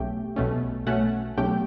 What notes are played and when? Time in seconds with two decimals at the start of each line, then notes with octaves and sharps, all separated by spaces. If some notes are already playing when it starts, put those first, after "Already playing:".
Already playing: B1 B2 A3 C#4 G4 G5
0.36 B1 B2 A3 C#4
0.86 B1 B2 A3 C#4 F#5
1.37 B1 B2 A3 C#4 G4 G5